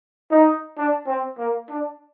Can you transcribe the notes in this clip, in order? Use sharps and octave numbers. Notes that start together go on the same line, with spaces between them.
D#4
D4
C4
A#3
D4